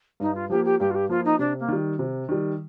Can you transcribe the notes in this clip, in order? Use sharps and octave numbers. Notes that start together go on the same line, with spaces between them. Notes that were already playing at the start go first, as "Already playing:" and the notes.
G2 D#4
F4
F3 A#3 G4
G4
G2 G4
F4
G4
F3 A#3 F4
D#4
C3 D4
A#3
D#3 G3
C3
D#3 G3